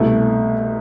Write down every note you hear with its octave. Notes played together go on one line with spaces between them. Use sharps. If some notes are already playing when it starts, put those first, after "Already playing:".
Already playing: C2 B2 A3